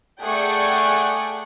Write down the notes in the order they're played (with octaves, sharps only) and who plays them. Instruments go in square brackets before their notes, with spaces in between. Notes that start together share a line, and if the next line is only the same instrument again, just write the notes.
[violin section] A3 G#4 D5 F#5 G5 C#6